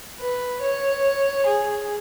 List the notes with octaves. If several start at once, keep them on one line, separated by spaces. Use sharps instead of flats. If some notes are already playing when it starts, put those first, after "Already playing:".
B4
C#5
G#4